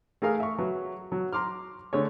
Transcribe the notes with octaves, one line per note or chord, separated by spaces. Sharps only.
A3 G#4 A#4 F5 F6
E5 C#6
F#3 B4
F#3
A#5 C6 D6 F6
D3 A3 G#4 C#5